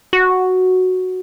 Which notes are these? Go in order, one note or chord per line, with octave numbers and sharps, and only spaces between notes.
F#4